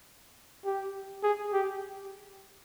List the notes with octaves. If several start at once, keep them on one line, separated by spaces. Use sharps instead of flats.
G4
G#4
G4